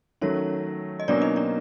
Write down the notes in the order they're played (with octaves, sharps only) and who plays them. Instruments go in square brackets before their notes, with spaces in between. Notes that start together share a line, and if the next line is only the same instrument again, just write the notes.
[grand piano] D#3 F#3 A3 [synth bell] C#4 C#5
[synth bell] D#5
[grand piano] B2 F#3 A#3 C#4 [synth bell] D4 D5
[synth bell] D#4 D#5
D4 D5